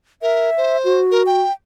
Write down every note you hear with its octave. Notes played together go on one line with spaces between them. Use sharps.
A#4 E5
C5
F#4
A#4
G5